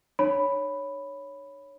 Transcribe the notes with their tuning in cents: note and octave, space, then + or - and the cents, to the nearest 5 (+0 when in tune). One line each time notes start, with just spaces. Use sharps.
D#4 -45 C#5 +0 B5 +0